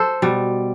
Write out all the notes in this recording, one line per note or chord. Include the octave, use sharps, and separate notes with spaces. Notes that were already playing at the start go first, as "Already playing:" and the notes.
Already playing: A4 C5
B2 G3